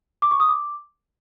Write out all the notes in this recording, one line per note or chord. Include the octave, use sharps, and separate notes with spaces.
D6
C#6
D#6
D6